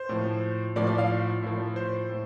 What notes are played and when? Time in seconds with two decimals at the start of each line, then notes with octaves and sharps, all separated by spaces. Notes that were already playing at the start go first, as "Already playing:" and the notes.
Already playing: C5
0.09 A2 F3
0.76 A2 F3 D5
0.87 D5
0.98 F5
1.43 A2 F3
1.76 C5
2.09 A2